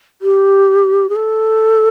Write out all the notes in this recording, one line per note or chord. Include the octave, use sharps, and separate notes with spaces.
G4
G#4
A4